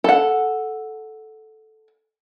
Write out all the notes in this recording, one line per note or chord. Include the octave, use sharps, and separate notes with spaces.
A4 F#5